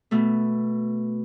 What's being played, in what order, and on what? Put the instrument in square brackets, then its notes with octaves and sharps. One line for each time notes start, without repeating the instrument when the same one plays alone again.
[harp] B2 A3